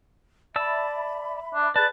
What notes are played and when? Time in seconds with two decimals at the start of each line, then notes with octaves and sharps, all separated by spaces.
0.56 D5 E5 A5 B5 E6
1.55 D4
1.76 G#4 B4 D5 A5